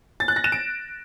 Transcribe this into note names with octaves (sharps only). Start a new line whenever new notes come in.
A6
F#6
A#6
E7
D7